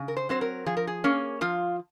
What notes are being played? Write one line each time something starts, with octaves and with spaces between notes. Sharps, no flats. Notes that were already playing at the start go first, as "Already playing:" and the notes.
Already playing: C#3
A#4
C5
F#3 C4 C5
A#4
F3 G#4
A#4
G#4
A#3 C#4
F3 F4